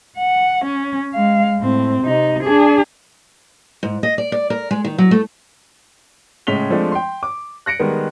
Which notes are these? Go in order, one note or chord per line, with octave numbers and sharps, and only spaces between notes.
F#5
C#4
G#3 F5
A2 C4
C3 D#4
D4 G#4
G#2
D#5
D5
D5
A#4
G#3
D#3
F#3
A3
A2 C#3 G#3 B6 F7 G7
F3 G#3 A3 C4 D4
G5 C6
D6
F#6 A#6 C#7 D7
D#3 G3 G#3 B3